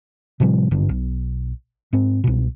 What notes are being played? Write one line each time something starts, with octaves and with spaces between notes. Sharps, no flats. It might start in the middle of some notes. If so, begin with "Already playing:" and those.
A2 C3 F3 G3
G#1 G2 D3
B1
G#2 C4
C2 B2